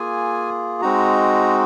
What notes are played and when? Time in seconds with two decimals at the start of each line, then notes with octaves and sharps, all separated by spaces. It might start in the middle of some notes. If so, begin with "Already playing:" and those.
Already playing: A#3 F4 G#4 G#5
0.81 G#3 C4 D#4 F#4 A#5